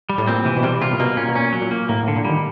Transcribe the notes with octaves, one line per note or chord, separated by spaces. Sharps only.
G3
A2
A#2 C4
C3 E3
B2
C3 G3
C3 F4
A#2
B2 A#3
A#2 C#4
B2
A#2 C#4
F#3
A#2
A#3
A2 A#3
A2
D3
A#2
D#3 G3